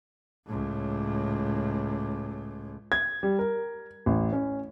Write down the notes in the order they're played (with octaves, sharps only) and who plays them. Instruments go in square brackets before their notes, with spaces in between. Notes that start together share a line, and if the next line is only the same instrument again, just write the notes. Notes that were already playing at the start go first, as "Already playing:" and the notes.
[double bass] C#2 A2
[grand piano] G#6
G3
A#4
A1
C#4